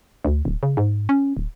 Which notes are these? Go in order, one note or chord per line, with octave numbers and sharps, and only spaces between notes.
D2
D1
C#3
G#2
C#4
D1